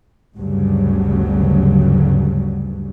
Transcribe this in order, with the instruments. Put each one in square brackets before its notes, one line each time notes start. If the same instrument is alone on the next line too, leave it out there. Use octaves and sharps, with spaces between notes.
[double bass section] G1 D2 G2 C#3 F#3 G3